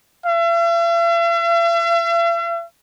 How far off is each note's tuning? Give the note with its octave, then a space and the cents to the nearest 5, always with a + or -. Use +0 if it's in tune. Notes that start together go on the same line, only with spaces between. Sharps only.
E5 +45